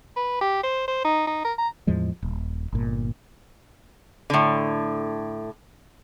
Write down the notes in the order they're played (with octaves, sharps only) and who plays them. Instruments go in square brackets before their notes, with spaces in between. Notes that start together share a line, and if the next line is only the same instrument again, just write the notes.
[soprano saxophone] B4
G4
C5
C5
D#4
D#4
A#4
A#5
[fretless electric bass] E2 A2 F3 G#3
D#1
G1 A#2
[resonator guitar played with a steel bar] A2 D3